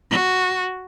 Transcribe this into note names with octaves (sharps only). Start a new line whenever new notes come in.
F#4